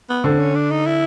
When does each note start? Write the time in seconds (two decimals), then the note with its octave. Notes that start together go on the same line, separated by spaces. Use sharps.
0.09 B3
0.24 D3 C4
0.39 C#4
0.55 D4
0.70 D#4
0.86 E4